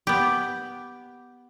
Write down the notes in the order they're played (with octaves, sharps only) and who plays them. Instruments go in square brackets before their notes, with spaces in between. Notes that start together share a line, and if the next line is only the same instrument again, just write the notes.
[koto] B3 G4